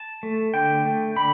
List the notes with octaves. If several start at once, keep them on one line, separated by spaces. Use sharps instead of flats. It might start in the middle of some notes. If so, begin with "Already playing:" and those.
Already playing: A5
A3
D3 G5
A3
D3 B5